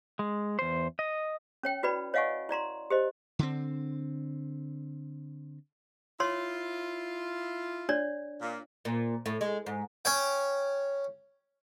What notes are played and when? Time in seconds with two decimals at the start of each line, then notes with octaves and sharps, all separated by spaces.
0.19 G#3
0.59 E2 C5
0.99 D#5
1.63 C#4 C#5 G5
1.83 E4 F#4 B4 D5 B5
2.14 C#5 D#5 F5 F#5 G#5 C#6
2.49 E4 D5 A#5 C6
2.90 G4 C5 D#5
3.39 D3 C4
6.20 E4 F4 C#5 C6
7.89 D4 C#5 D5
8.41 A#2
8.85 A#2
9.26 A2
9.41 G#3
9.66 G#2
10.05 C#4 C#5 G5